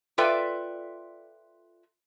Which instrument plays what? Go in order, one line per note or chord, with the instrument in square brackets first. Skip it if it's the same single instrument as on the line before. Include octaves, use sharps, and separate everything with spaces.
[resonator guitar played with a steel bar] F4 A4 B4 D5 E5 G5